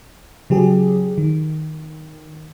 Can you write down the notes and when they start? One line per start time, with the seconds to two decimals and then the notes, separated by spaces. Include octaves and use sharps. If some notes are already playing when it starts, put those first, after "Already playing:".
0.50 C#3 F#3 G4 G#4
1.18 D#3